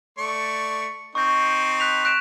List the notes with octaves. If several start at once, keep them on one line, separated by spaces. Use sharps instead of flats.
A3 D5 C#6
C4 D#4 C#6 G6
F#6 B6 F7
F#6 D7 E7